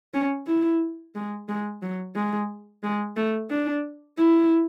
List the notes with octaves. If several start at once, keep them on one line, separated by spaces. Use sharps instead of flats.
C#4
E4
G#3
G#3
F#3
G#3
G#3
A3
D4
E4